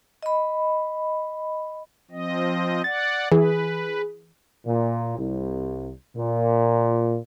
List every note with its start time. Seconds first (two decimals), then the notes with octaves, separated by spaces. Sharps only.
0.23 D#5 B5
2.11 F3 C4 D#5
2.84 D5 F#5 A6
3.32 E3 G#4 B4
4.66 A#2
5.17 C2
6.16 A#2